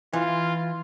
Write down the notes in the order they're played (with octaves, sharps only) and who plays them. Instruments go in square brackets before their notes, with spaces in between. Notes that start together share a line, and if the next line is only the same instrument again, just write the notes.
[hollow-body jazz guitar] E3 [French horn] F4